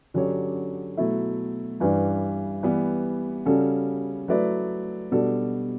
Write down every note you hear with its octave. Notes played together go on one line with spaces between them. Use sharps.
D3 F#3 C#4 G4 C#5
B2 F#3 A3 E4
G2 E3 G3 D4
E3 G3 B3
C#3 G3 C#4 F#4 A4
F#3 A3 E4 B4 D5
B2 G3 D4 F#4 A4